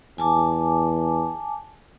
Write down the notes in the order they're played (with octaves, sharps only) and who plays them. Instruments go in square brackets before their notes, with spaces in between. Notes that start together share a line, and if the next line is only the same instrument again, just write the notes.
[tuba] E2 [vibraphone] G#5 A5 D6